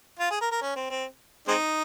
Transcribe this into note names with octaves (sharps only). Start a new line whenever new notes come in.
F4
G#4
A#4
A#4
C#4
C4
C4
G#3 C4 D#4